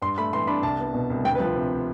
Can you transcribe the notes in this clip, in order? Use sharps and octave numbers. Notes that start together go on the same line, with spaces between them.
G2 C6
A3 B5
E3 C6
D4 B5
C2 A5
B3
B2
C2
D2 G5
B4
F3
C3